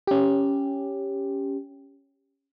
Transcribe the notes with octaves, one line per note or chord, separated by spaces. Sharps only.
C#4 G4